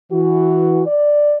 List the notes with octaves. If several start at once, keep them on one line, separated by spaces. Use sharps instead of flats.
E3 F#4
D5